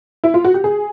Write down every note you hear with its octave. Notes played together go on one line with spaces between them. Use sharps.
E4
F4
F#4
G4
G#4